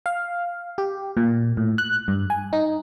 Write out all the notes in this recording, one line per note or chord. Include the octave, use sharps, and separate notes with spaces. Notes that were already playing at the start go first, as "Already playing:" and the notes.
F5
G4
A#2
A2
F#6
G2
G#5
D#4